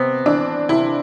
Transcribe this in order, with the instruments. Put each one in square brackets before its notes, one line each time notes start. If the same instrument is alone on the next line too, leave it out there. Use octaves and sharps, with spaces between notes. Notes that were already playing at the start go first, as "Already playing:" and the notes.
Already playing: [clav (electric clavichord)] C3 B3 [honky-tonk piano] C4
[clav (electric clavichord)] E3 [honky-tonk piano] D4
[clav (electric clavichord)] C3 [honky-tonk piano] E4